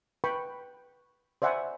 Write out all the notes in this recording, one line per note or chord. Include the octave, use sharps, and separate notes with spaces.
B4 G5 B5 C#6
C5 D5 E5 F#5 G#5 B5